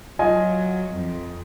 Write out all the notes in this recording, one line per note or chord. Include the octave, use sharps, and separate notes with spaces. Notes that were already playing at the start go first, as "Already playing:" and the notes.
F#3 F4 D#5 G#5
F2